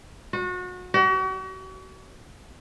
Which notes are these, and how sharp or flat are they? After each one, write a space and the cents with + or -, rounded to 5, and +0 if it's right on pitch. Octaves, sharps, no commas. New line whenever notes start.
F#4 -30
F#4 +40